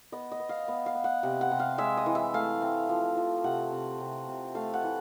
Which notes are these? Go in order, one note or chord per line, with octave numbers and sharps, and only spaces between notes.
B3 D#5
D#5
B3
F5
B3
F5
B3
F#5
C3
F#5
C3
F5
G#3 E5
D#5
E3
E5
A3 F5
C4
F3
F3
C3 F#5
C3
C3
C3
A3 F5
F#5
E3